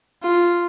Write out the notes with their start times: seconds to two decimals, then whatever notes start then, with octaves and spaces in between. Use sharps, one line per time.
0.23 F4